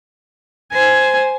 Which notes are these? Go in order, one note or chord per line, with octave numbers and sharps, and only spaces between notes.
C5 G#5